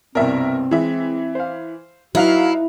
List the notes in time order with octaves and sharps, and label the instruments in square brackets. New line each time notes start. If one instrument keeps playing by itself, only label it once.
[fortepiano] C2 G2 B2 [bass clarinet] C4 [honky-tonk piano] A#4 E5
[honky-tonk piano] E3 E5 [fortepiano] G#3
[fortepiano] C5 F5
[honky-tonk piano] F#3 F5 F7 [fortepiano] D#4 B4 [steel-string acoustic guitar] E4 [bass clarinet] F#4